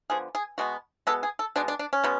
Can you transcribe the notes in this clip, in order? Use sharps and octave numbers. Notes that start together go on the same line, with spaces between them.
D3 F3 B3 G#4
G#4
B2 G#3 B3 F#4
B2 G#3 B3 A4
G#4
A4
B2 G#3 B3 D4
D4
D4
C#4
B2 G#3 B3